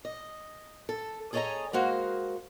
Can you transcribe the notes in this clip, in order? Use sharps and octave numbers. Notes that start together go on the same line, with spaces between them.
D#5
A4
G#4 A4 C#5 D#5 G#5 A#5
G#3 A#3 F#4 C5